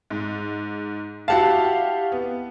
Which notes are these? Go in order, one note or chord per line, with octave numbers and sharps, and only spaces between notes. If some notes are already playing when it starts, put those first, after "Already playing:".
G#2
E4 F#4 G4 F5 F#5 A5
B3